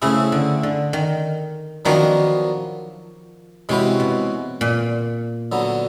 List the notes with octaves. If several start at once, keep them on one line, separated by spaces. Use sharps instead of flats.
C#3 A3 C4 E4 G#4
D3
D3
D#3
D#3 F3 F#3 B3 D4 F#4 A#4
C3 E3 G#3 C#4 F#4 B4
B2
A#2
D3 F#3 B3